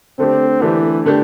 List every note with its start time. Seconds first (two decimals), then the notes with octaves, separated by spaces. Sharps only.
0.18 D3 A3 C4 D4 G4
0.61 D3 E3 A3 D4 G4
1.05 D3 A3 D4 G4